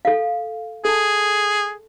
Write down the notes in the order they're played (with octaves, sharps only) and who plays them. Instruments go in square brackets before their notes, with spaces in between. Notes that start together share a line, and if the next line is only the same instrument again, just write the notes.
[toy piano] A4 F5
[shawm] G#4 [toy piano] A4 A5